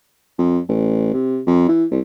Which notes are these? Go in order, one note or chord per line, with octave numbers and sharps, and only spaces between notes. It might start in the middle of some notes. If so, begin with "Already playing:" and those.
F2
A1
C3
F2
E3
C2